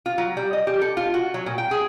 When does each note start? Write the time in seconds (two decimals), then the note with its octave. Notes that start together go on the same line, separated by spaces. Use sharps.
0.06 F4
0.18 F#3
0.37 G3
0.53 D#5
0.67 G4
0.82 A4
0.97 F4
1.14 F#4
1.34 F#3
1.46 A#2
1.58 G5
1.71 G#4